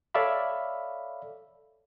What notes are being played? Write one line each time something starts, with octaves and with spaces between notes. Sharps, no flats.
A4 C#5 D5 E5 F5 B5